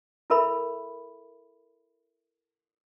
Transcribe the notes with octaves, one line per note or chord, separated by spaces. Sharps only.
E4 A4 A#4 E5 B5